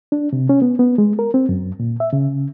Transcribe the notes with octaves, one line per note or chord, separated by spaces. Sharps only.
D4
C3
C#4
B3
B3
G#3
A#4
C4
F#2
A#2
E5
C#3